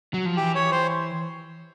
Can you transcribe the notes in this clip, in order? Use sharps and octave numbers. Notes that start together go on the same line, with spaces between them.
F#3
F3
E3 G4
C#5
C5